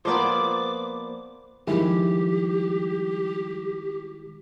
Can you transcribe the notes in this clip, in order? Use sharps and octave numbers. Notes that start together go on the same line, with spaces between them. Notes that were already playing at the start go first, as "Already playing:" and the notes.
F3 A#3 B3 C5 D5 D6
D#3 F3 G3 G#3 E4 G4